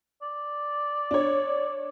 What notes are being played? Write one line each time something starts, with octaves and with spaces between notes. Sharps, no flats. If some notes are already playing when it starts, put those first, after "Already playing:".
D5
D4 C#5